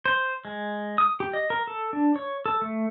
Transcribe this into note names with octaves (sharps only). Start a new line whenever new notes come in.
C5
G#3
D#6
G4
D#5
A#4
A4
D4
C#5
A4
A3